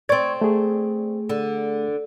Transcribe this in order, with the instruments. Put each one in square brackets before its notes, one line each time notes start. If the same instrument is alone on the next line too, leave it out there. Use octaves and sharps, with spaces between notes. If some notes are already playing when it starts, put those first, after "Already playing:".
[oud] C4 D5 [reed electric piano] C#6 G#6
[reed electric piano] A3 G#4
[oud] D3